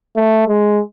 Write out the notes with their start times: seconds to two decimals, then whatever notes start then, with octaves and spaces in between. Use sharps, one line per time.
0.16 A3
0.48 G#3